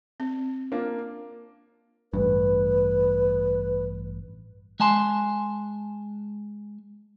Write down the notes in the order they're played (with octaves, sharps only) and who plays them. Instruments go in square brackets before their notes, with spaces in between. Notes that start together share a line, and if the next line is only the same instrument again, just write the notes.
[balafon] C4
[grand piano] A#3 D4 F4
[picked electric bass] A1 G2 [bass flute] B4
[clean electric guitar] G#3 G#5 A5 C6